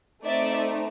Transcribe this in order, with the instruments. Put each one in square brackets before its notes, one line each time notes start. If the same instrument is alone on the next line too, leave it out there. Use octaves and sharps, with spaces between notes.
[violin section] A3 C4 D#4 D5 E5